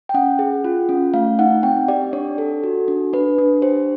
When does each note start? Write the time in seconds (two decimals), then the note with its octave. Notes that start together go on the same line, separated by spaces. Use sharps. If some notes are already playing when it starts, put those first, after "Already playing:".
0.09 G5
0.14 C#4 F#5
0.39 G#4
0.64 F4
0.89 C#4
1.14 A3 F5
1.39 D#4 F#5
1.63 C4 G5
1.88 G4 D5
2.13 D4 C#5
2.38 A4
2.64 F#4
2.88 D4
3.13 D4 B4
3.38 D4
3.62 G4 C5